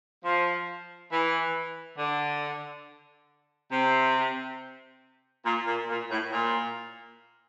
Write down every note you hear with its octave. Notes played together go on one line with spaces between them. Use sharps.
F3
E3
D3
C3
A#2
A#2
A#2
A2
A#2